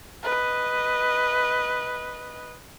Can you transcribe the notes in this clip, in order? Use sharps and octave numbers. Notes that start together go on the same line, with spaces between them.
B4 D#5